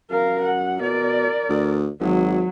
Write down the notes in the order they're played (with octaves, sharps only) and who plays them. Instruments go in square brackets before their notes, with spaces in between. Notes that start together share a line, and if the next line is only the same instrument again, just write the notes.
[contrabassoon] F#2 [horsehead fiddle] A#4 F5
[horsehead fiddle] F#5
[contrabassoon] B2 [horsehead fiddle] A#4 D5
[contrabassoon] D2
[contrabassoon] G#1 [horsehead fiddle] F#3